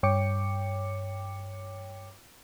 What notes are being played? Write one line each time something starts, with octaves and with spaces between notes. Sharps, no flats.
G2 C#5 G5 D6 C#7